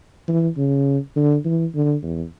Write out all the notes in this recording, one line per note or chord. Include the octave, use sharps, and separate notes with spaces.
E3
C#3
D3
E3
D3
E2